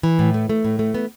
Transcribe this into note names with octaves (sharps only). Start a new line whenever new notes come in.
E3
A2
A3
A3
A2
A3
B3